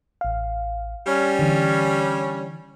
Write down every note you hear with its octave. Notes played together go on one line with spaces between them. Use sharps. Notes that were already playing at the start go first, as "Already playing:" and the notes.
A1 F5
G3 C#4
D3 E3